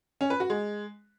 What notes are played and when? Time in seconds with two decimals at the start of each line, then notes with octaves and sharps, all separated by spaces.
0.21 C#4
0.30 B4
0.40 F#4
0.50 G#3